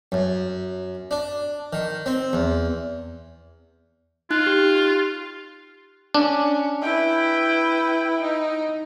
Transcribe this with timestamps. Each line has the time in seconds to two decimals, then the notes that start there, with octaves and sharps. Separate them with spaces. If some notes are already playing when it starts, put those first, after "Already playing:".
0.12 F#2
1.11 D4
1.73 D#3
2.06 C4
2.33 E2
4.31 D#4 F4 F#6
4.46 G4
6.14 C#4 D4
6.82 E4 B4 G5
8.22 D#4